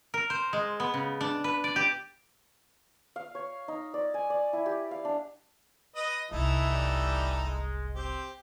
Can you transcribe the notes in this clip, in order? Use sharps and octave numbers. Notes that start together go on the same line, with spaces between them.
A#4
C5
G#3
B3
C#3
D4
B4
D5
G4
F5
C#5
D#4
D5
G#5
D5
E4
G4
F5
D4
B4 D#5 D#6
F#1 C2 E3 D#4 E4 A4
G3
G#3
C4 G4